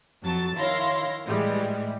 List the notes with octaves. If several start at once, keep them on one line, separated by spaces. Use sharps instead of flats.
F2 F#3 A5 A6
D#3 E4 C#5 F5 C6 A#6
A2 E3 G3 G#3